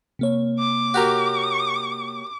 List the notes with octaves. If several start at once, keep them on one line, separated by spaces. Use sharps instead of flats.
C3 A#3 C#5
D6
F#4 G4 A#4